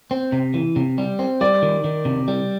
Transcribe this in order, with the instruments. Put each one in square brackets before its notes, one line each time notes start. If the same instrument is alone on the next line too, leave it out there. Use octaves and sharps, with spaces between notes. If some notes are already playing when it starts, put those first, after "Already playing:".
[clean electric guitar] C4
C3
E3
C3
G3
C4
[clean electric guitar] G3 [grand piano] D5
[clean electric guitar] D#3
D#3
C3
G3